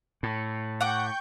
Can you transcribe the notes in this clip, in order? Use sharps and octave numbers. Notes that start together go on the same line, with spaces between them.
A2
F#5 G5 C#6 D6 G6